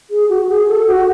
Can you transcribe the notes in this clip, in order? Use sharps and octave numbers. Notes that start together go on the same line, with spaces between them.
G#4
F#4
G#4
A4
F#4